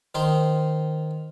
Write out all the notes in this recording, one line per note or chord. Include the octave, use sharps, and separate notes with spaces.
D#3 D#4 C5 C6